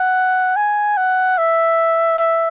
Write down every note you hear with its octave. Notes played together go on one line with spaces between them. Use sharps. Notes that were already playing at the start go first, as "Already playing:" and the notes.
Already playing: F#5
G#5
F#5
E5
E5